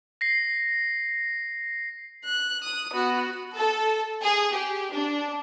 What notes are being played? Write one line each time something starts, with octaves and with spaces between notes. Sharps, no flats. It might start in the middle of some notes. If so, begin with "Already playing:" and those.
A#6 C7
F#6
D#6
B3 F#4
A4
G#4
G4
D4